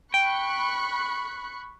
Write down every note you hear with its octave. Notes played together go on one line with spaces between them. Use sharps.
G5 B5 C#6 F#6